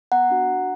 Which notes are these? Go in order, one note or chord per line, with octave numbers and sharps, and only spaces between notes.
B3 F#5 A#5
D4 F#4
D4